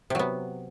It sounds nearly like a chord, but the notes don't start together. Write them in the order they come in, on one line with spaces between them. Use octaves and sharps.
C3 F#3 B3